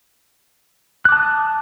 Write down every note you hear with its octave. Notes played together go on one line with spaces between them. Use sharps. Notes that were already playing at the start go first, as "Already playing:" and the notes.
A5 D6 D#6 F#6